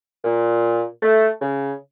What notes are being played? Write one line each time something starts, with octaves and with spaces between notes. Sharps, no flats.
A#2
A3
C#3